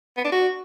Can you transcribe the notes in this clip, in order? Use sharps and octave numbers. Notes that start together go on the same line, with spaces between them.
B3
D4
F#4